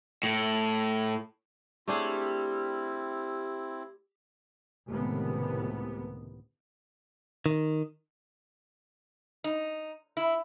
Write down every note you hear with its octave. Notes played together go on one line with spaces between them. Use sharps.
A2
G3 A3 C4 D4 E4 G#4
C#2 A2 C3 D#3 B3
D#3
D#4
E4